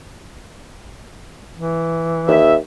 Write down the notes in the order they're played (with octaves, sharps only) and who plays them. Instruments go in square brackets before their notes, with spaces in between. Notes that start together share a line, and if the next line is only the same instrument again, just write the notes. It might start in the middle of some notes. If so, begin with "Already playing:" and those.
[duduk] E3
[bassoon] D#2 [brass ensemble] E5